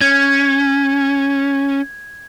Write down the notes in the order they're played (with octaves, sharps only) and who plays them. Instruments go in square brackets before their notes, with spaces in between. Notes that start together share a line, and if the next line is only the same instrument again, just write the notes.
[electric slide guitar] C#4 [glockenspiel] G#6